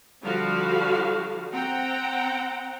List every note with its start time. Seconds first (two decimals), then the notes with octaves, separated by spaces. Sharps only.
0.22 D3 F3 G3 F#4 F5
1.51 C4 F#5 G5 A#5